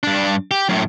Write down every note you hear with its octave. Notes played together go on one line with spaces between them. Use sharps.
G2 D4
G4
F#2 A2